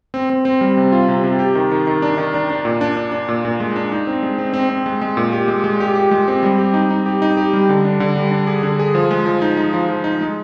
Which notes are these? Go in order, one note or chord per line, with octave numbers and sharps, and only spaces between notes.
C4
C4
C4
G3
C3
F4
C3
C3
G4
D#3
D#3
D#3
D4
D#3
D4
D4
A#2
D4
D4
D4
A#2
A#2
G#3
D4
D#4
C4
G#3
C4
C4
C4
G#3
G#3
A#2
G4
G#3
G#3
G4
G4
G#3
C4
G3
G4
D#4
D#4
G4
D#4
G4
G3
D3
D4
D3
G3
D4
G#4
D3
G#4
F3
G#3
F3
D#4
D#4
F3
F3
D#4
G#3